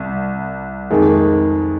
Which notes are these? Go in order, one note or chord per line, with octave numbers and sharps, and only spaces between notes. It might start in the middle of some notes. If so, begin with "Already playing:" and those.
Already playing: C2
F2 D#3 G#3